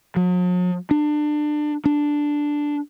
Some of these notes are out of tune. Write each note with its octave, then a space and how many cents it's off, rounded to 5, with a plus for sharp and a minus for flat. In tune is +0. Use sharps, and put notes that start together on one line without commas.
F#3 -45
D4 +25
D4 +0